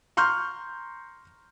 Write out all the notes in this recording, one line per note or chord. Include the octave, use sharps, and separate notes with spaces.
A#5 C6 C#6 F6 G6